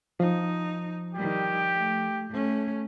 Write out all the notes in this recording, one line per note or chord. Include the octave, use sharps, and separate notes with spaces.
F3 D#4
D#3 G3 G4
A3
A3 C#4